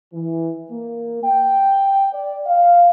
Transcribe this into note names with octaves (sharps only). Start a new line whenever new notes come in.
E3
A#3
G5
D5
F5